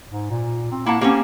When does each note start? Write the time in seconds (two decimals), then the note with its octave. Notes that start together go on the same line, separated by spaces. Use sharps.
0.10 G#2
0.30 A#2
0.72 C4
0.86 A#3 E4 F#5 A5
1.01 A#3 C4 C#4 G4